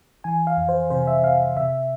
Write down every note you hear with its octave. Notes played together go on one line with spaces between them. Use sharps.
E3 G#5
F5
F2
C5
C3 C5
E5
C3 F5
C3 E5